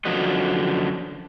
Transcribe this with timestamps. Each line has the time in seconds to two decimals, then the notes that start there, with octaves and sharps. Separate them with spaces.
0.05 F#2 D3 F3 F#4 D#5